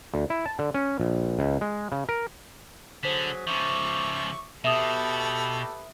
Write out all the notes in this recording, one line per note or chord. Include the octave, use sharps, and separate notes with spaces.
D2
E4
A5
D3
C#4
A#1
C#2
G#3
C#3
A#4
D3 F#3 G#4 C5 B6
C#3 F3 E5 C#6 D6
B2 G4 A4 B4 E5 D#6